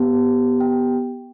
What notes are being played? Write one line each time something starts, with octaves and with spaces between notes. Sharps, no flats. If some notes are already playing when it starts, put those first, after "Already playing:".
Already playing: B3 G4
G5